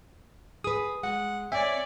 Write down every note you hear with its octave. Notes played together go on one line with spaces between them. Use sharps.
G#4 B4 D#6
G#3 F#5
C4 C#5 D5 E5 G#5